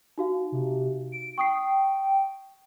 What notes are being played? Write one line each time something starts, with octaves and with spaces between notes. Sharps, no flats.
D#4 F#4 F5
C3
D7
G5 C#6 D#6 C7